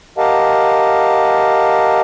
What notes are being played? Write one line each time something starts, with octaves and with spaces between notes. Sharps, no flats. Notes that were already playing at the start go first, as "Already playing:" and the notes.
G4 A#4 D#5 F5 F#5 A5